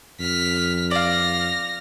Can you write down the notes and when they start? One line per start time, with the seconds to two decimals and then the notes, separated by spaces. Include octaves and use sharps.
0.20 F2 F6 B6
0.91 D5 F5 F6 A#6